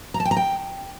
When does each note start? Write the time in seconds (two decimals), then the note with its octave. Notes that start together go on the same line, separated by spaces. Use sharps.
0.14 A#5
0.20 A5
0.25 G5
0.31 A#5
0.37 G5